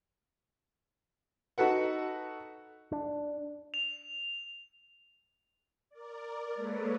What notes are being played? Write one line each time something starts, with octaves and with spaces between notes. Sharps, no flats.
D#4 F#4 A4 B4 F#5
D4
F7
A#4 D5
G#3 A#3 A4 B4 C#5